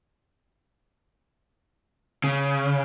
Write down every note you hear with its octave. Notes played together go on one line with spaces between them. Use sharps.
C#3